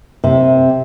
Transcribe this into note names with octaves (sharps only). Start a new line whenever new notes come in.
C3